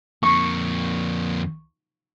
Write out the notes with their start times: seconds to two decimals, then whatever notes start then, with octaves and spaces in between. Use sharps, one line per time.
0.23 F2 A#3 C#6